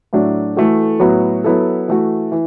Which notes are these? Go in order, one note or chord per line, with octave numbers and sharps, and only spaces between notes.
A2 F#3 A3 D4 F#4
E3 A3 F#4 A4
A2 F#3 B3 F#4
F#3 B3 E4 A4
E3 A3 F#4
E3